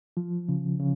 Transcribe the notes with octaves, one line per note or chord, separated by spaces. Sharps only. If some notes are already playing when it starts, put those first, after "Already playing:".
F3
C#3
C#3